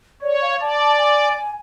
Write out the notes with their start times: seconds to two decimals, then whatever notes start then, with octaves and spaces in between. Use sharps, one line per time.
0.22 C#5 D5
0.42 F5
0.61 D5 A5
0.79 A5
0.98 G#5